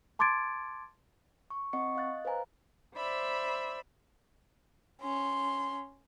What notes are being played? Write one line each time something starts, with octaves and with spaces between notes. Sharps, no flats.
A5 C6 D6 G#6 A6 D7
C#6
C4 D#5 F#5 C#6 C#7
D#5 F5 F#6 A6
B4 C5 F5 G#5 A#5
C5 D5 E5 B5
C#4 C6